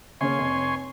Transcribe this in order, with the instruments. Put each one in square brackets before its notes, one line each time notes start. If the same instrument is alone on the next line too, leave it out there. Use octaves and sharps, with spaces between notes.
[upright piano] C#3 A#3 C#4 [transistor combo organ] C#5 G#5 C6
[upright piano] F1